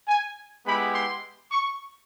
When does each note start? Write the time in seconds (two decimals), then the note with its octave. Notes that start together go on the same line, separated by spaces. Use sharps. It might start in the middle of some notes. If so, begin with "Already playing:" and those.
0.08 G#5
0.65 G#3 B3 E4 G4 B5
0.93 C6
1.51 C#6